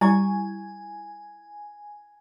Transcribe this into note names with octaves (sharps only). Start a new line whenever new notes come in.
G3 E4 G#5 C#6 G#6